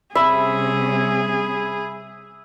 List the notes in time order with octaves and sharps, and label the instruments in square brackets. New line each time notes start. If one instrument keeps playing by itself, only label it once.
[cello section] C3 G3 C#4 [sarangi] G#4 [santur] E5 [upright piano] B5